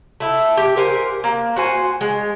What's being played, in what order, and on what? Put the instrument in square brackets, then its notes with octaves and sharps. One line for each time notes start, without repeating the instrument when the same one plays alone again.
[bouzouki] A3 E4
G4
A#4 C5 F#5 G#5
A#3
F#4 C5 G#5
G#3